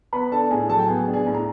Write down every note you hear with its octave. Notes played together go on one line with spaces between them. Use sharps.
B3 B4 B5
D4 A4 A5
A2 G#4 G#5
F#3 A4 A5
G5
B3 G#4 G#5
D4
G#4 G#5
A2
A#5